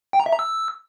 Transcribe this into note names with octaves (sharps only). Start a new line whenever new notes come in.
G5
A#5
E5
A#5
E6